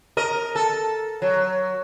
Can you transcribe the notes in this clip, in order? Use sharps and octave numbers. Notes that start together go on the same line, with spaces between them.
A#4 D#5
A4
F#3